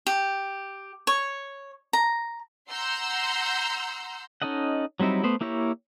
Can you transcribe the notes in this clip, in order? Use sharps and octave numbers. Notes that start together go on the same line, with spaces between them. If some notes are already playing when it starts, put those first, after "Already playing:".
G4
C#5
A#5
F#5 A#5 C6 E6 G6
C#4 D#4 A4 D#5 F#5
F#3 G3 C4 D#4 E4
A3 B3 C5
A#3 E4 G4 A#4 C#5